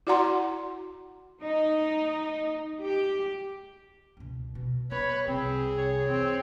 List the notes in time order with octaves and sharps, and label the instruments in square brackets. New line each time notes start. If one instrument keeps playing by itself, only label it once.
[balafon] E4 F#4 D5 F#5 A#5 C6
[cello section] D#4
G4
[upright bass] C#2 B2
B2
[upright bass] B3 [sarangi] B4 [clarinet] C#5
[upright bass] C2 C3 [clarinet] C4 [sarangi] G#4
[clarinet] C#5
[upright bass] E2 [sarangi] C4